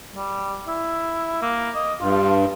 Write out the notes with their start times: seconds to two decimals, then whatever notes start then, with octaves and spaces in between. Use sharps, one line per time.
0.14 G3
0.67 E4
1.42 A#3
1.75 D#5
2.01 G2 F4